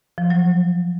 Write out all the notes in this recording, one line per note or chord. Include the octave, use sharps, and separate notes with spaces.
F3
F#3